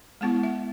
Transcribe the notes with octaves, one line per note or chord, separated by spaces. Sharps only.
G#3 B3 E4 F#5
E5